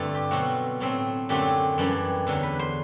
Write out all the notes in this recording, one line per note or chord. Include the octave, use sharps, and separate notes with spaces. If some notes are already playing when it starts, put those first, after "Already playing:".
Already playing: G2 D3 A3 C4 A4
G4
B2 F#3 A3 C4 F#4
A2 F#3 A3 C4
F#2 D3 F#3 A3 C4 G4
F#2 E3 G3 D4
E2 D3 F#3
B4
C5